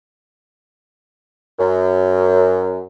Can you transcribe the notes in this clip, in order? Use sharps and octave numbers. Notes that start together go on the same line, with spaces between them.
F#2